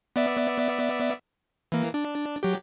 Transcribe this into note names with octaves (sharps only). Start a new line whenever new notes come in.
B3 D5 E5
E3 A#3
D4
F#3 G4